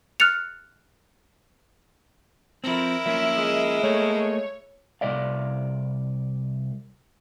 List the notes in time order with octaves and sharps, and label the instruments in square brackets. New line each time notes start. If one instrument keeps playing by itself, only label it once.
[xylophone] F6 F#6 A6 C#7 F7
[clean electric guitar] F3 C4 [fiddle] E4 A#4
[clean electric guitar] F3 A#3 C#4 [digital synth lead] E5
[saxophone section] G#3
[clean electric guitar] A3 A#3 A4 [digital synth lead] C#5
[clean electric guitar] C2 D5 F5